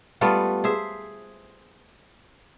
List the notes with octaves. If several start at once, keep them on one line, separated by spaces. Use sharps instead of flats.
G3 A3 B3 F4
G#4 C5 E5